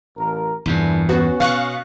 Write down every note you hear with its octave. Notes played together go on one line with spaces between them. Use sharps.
A1 A#4
E2 G2 A#2 D3 E3
B3 C#4 F#4
B2 F5 C#6 F#6